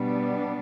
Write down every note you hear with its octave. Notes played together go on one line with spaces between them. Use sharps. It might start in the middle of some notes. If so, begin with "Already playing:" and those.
Already playing: B2 G3 B3 D4